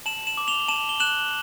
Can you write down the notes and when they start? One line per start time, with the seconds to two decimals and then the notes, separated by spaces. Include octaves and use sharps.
0.06 A5 E7 F#7
0.27 E7 F#7
0.37 D6
0.48 F7 G7
0.68 A5 E7 F#7
0.89 G7
1.00 F#6 E7 F#7